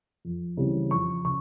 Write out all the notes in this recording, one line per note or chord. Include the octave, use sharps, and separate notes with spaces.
F2
C#3 E3 G3 C4
F2 C#6
C#3 C#6